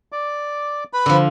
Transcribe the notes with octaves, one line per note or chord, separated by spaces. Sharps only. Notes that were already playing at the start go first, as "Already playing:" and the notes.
D5 D6
B4 B5
D3 F3